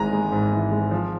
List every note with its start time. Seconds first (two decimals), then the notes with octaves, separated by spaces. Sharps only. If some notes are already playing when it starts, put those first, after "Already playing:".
Already playing: G#1 G#2 E3 G#3 G#5 A#5
0.13 G#3
0.32 G#2
0.52 E3
0.71 G#3
0.91 F3